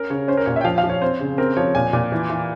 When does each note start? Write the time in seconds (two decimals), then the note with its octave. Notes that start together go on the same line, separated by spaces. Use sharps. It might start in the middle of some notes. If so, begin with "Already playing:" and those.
Already playing: C#4 A#4
0.10 C#3 C#5
0.28 C#4 C5
0.37 A#4
0.46 A#2 C#5
0.56 E5
0.61 G5
0.64 F3 F5
0.78 F5
0.84 F3
0.90 C#5
1.01 C4 C5
1.21 C#3
1.38 C4 A#4
1.57 F3 C#5
1.75 A#2 G#5
1.93 A#2
2.12 E3
2.30 E3